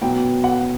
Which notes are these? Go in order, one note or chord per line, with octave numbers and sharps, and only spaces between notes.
B2 F#3 B3 G5
F#5